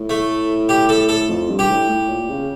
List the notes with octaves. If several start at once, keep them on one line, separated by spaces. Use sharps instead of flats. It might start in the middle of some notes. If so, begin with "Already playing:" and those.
Already playing: A2
A3
G4
A4
A4
F2
G2
G4
A2
A2
A#2
C#3